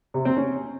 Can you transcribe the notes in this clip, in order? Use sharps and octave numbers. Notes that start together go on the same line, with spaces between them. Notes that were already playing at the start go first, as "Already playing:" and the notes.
C3
C4
C#4